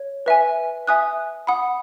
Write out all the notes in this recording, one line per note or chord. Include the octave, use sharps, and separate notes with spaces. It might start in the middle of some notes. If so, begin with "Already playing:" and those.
Already playing: C#5
B4 E5 G#5
E5 G#5 D#6 F#6
F#5 B5 D#6